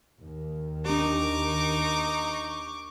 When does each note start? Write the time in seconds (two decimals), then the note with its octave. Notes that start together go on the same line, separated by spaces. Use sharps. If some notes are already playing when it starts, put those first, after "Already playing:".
0.20 D#2 D#3
0.86 D4 D#4 G4 A#5 C#6 D6